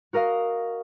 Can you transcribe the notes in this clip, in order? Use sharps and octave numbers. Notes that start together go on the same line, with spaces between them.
F#4 A#4 D#5 F5